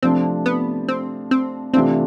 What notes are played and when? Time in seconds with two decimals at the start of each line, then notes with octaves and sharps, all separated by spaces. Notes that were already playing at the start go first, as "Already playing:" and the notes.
0.03 C3 F3 A3 C4 D4
0.46 B3
0.89 C4
1.31 C4
1.74 C3 E3 A3 C4 D4 F4